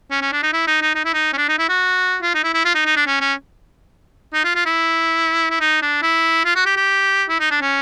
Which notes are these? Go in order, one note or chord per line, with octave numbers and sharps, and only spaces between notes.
C#4
C#4
D4
D#4
E4
D#4
D#4
D#4
E4
D#4
C#4
D4
D#4
E4
F#4
F4
D#4
E4
E4
F4
D#4
D#4
D4
C#4
C#4
D#4
F4
F4
E4
E4
D#4
D4
E4
F4
F#4
G4
G4
E4
D#4
D4
C#4